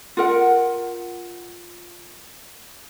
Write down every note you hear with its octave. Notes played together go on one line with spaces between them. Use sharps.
F4 A#4 F#5